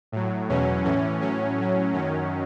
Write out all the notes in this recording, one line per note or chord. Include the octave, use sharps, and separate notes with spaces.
A2 F#3
E2 B2 F#3 C#4
A2 E3 C#4
A2 F#3 C#4
A2 F#3
F#2 D#3 F#3 C#4